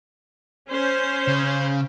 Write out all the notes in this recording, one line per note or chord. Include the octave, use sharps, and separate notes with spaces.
C#4 C5
C#3